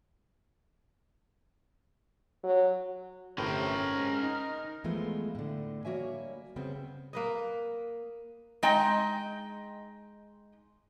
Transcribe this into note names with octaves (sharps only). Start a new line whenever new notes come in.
F#3
G1 A2 C3 C#4 A#4 F5 G5
G#2 G#5
D#4
E3 F3 G#3 A3 B3 F4
A2 D3
G3 A#3 F#4 C#5 E5 G#5
C#3 G3 B3 C4 G#4
A#3 B4 D#5
G#3 D#4 D#5 G5